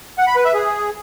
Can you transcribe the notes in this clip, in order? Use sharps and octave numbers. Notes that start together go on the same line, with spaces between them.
F#5
B5
B4
E5
G#4